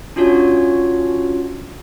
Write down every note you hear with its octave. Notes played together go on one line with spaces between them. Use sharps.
C#4 D4 F4 F#4 C#5